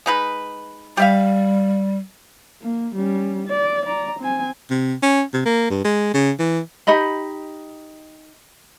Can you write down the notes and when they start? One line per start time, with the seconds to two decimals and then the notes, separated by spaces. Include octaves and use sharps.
0.06 G#3 D#4 B4
0.97 G3 G4 E5 F5
2.62 A#3
2.95 G3 C#4
3.47 D5
3.85 D5 A#5
4.19 C4 G#5
4.70 C3
5.03 C#4
5.34 C3
5.46 A#3
5.70 G2
5.84 G#3
6.14 C#3
6.39 E3
6.87 D#4 G4 D#5 B5